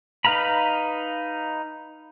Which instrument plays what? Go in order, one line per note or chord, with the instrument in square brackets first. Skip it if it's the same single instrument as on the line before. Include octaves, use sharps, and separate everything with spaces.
[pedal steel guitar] D#4 B4 F5 A#5 B5